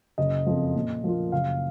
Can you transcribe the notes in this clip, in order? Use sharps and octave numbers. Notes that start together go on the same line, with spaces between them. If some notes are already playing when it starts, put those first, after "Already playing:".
F#1 D#5
F2 F3
A#2
F3 A#3 F4
F#1 F5